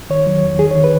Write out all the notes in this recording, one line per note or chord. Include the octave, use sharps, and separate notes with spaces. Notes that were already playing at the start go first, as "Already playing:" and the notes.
D#3 C#5
F#3
E2
D#3 G#4
C#5
D#3
B4